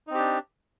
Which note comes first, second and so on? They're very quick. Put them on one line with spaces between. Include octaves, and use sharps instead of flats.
D#4 C4 G4 D4